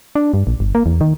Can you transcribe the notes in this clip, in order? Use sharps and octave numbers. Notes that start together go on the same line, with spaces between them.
D4
G2
A#1
G1
A#3
E2
D#3